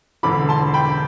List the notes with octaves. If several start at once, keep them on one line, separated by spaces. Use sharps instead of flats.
E1 E2 D3 B5 D6
A5 C6
G5 B5